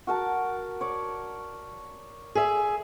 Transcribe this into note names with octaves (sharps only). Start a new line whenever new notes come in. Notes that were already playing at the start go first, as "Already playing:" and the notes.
F#4 A#4 A5
C#5 D5
G#4 E5